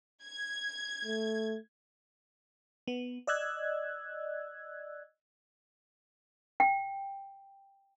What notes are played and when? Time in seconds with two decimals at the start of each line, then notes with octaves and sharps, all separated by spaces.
0.24 G#6
1.05 A3
2.87 B3
3.27 D5 D#5 E6 F#6 G#6
6.60 G5